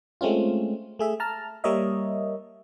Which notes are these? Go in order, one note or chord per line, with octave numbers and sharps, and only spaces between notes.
G#3 A3 C4 C#4 F4
A3 G#4 E5
A5 A#5 F6
G3 A#3 A#4 C#5 D#5 E5